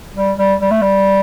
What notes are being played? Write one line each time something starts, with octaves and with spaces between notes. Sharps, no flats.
G3
G3
G3
A3
G3